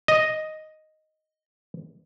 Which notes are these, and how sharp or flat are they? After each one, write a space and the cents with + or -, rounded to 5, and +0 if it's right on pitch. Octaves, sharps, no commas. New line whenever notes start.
D#5 +0